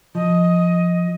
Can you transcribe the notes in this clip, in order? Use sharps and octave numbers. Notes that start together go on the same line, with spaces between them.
F3 D#5